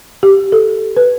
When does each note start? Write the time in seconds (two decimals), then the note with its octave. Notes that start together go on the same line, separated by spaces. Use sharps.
0.23 G4
0.52 A4
0.97 B4